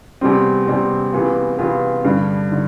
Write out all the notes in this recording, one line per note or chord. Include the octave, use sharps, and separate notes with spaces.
E2 C3 G3 C4
E2 C3 G3 C4
E2 C3 E3 B3 F4
E2 C3 E3 B3 F4
G2 D3 G3
D3